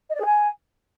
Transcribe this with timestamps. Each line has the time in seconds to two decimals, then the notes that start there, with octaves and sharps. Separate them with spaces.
0.09 D#5
0.15 D5
0.20 G#4
0.25 G#5